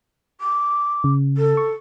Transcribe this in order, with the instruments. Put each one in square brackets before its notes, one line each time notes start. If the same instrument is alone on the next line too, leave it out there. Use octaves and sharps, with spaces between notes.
[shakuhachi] D6
[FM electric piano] C#3
[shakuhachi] A4
[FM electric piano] C#6